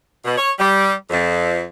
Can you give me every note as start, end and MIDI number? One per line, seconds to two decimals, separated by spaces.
0.23 0.37 47
0.38 0.51 73
0.59 0.92 55
1.10 1.63 41